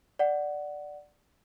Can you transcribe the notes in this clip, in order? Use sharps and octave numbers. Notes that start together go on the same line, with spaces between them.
D5 F#5